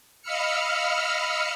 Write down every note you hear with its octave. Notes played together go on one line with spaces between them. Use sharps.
D#5 F5 B5 E6 F6 C#7